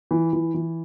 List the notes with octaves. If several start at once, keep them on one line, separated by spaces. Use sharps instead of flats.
E3
E3
E3